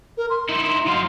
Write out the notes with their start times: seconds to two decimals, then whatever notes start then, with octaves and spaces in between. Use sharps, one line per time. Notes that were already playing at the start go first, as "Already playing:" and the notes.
0.17 A#4
0.30 C6
0.49 D#4 E4
0.87 F#3 F5